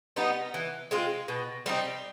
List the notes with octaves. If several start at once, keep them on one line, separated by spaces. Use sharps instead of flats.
G3 B3 D#4
E3
G#3 C4 F4
B2
G3 C4 D#4